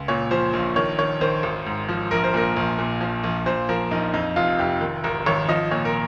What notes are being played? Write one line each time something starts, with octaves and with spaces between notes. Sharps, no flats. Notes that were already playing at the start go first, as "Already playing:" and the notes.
Already playing: C#2
A#2 C#5
F3 C5
A#1
D#3 C#5
D#3 C#5
D#3 C5
G#1
G#2
F3
A#1 A#4
C5
A#2 A#4
A#1
A#2
F3
A#1
A#2 C5
F3 A#4
A#1 D#4
F2 D#4
F1 F4
F1 G4
D#3
G#1 A#4
G#1 C#5
F3 D#5
A#2 C#5
A#4